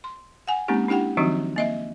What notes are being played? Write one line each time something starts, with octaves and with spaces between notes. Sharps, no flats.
C6
F#5 G#5
G#3 A#3 C4 C#4 D#4 G4
D4 E4 G4 F#5 G5
D#3 F3 F#3 C4 D#4 F#4
A#3 D#5 E5